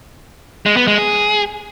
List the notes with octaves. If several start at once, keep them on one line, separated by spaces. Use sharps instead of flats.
G#3
B3
G#3
G#4